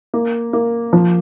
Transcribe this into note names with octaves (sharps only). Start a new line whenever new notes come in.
A#3
A#3
F3